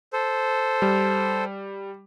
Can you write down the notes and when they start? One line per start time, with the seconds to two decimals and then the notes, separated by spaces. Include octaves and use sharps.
0.13 A4 C5
0.82 G3